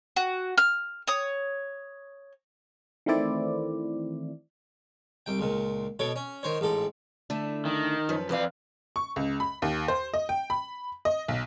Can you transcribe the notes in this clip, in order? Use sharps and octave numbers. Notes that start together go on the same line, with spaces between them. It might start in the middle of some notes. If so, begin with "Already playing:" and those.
F#4
F6
C#5 D#6
D#3 E3 A3 C4 E4 D5
C2 G5
C#2 A#2
B2 A4 C#5
C#4
D#3 C5 C#5
A1 G#2 A4
D3 A3 E4
D#3
F#2 F3 B4
F2 E3 B4 D5 F5
C#6
C#2
B5
D#2
C5
D#5
G5
B5
D#5
B1